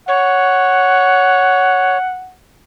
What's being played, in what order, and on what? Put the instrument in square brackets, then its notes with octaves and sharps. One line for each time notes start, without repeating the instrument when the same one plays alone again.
[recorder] C#5 [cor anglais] F#5